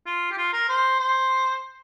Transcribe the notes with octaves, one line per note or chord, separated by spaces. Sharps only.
F4
G4
F4
A#4
C5
C5